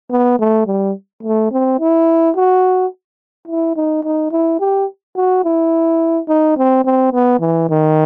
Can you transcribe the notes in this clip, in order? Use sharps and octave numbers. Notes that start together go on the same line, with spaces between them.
B3
A3
G3
A3
C4
E4
F#4
E4
D#4
D#4
E4
G4
F#4
E4
D#4
C4
C4
B3
E3
D#3